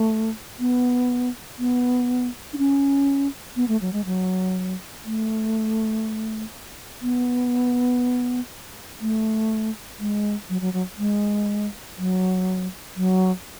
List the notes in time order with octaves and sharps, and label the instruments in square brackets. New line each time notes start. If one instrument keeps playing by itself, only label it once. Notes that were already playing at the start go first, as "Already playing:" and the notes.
Already playing: [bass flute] A3
B3
B3
D4
C#4
B3
A3
F#3
G#3
F#3
A3
B3
A3
G#3
F#3
F#3
F#3
G#3
F#3
F#3